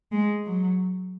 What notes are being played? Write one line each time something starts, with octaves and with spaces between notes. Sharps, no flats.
G#3
F#3